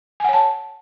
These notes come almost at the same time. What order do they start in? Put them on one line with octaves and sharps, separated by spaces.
G#5 F#5 C#5 A5